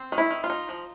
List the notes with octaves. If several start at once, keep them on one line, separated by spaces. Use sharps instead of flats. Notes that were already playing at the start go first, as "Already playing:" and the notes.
Already playing: C4
D#3
E4
D#3
F4
D#4
F3